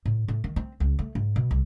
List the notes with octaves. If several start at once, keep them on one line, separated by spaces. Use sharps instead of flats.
A2
A2
D#3
C4
C#2
A3
G#2
B2
C2